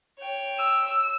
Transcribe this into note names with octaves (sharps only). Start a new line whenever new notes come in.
C#5 G5
E6